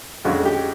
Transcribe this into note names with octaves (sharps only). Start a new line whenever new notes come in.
F2 D3 F3 G#3 C#4 F#4
G4